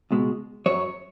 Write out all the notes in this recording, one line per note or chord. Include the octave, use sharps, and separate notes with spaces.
C#2 B2 G#3
F#2 F#3 C#5